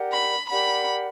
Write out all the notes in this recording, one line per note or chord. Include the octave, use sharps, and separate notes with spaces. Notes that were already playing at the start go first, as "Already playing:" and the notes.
Already playing: G4 A#4 D5 F#5
B5
G4 A#4 D5 F#5 B5